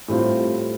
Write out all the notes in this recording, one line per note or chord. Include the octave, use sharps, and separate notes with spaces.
A2 G3 C4 F4